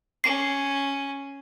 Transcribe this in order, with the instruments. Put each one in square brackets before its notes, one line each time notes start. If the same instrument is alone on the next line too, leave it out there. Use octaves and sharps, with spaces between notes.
[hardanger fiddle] C#4 [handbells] C7